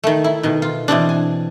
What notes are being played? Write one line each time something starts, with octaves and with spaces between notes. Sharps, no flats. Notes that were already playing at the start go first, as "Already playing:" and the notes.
D#3 A3
E4
B2 D#3
F4
B2 E3 C4 D4
G#5